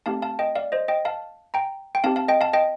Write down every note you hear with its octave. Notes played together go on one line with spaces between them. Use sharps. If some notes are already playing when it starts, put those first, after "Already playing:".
A3 C4 D#4 G4 F5 A5
F5 A5
D#5 G5
D5 F5
C5 D#5
D#5 G5
F5 A5
G5 A#5
G5
C4 D#4 G4 F5 A5
F5 A5
D#5 G5
F5 A5
D#5 G5